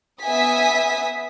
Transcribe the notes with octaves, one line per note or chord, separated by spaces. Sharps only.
B3 E5 G#5 D#6 B6